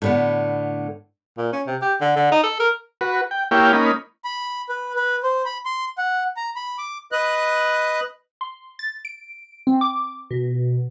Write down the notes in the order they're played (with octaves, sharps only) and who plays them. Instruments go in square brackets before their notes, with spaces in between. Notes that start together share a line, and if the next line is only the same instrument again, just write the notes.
[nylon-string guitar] A2 D3 B3
[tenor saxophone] A#2
C#4
C3
G4
D3
D3
D#4
A4
A#4
[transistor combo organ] F#4 B4
G5
A#3 E4 G4 C#5 F5 G5
A#3 C#4 D#4 B5
[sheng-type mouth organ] B5
B4
B4
C5
B5
C6
F#5
A#5
B5
D6
[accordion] B4 D#5 F#6
[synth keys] C6
A6
D7
C4
D6
B2